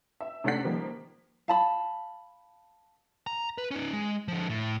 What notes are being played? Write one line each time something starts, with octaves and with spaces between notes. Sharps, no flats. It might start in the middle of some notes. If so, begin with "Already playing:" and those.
E5
C3 A3 C#4 D4 F#5 B6
D#3 F3 G3 A#3
F5 A5 B5
A#5
B4
C#4 D#4
G#3
D3 F3
A2